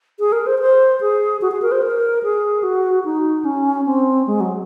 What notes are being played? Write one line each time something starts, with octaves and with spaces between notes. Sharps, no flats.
G#4
A#4
C5
C5
G#4
F#4
G#4
A#4
C5
A#4
G#4
F#4
D#4
C#4
C4
G#3
F#3